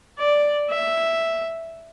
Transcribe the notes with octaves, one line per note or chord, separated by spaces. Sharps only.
D5
E5